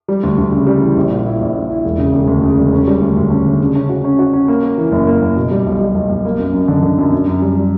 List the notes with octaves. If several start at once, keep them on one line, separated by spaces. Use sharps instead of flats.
G3
D2
D2
C#3
G3
E3
A#1
A#2
E4
A#1
A#1
E4
E1
C#3
E1
D2
C#3
E1
C#4
G3
D2
D2
C#4
D3
C#3
C#4
F#4
C#4
F#4
C#4
A#3
A#3
E3
F#1
A#3
F#1
B2
G3
B1
G3
B1
B1
A#3
F#2
F#2
D3
D3
F#2
F#2
F#2
G3
G3